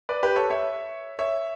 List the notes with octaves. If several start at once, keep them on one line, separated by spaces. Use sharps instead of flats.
B4 D5
G4 B4
A4 C#5
C#5 E5
C#5 E5